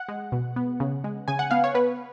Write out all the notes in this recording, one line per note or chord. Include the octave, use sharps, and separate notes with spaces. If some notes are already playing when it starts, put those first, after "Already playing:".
Already playing: F#5
G#3
B2
B3
C#3
G#3
C#3 G#5
F#5
B3 F5
C#5
B3 B4